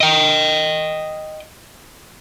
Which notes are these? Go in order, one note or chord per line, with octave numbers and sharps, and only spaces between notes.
D#5 G5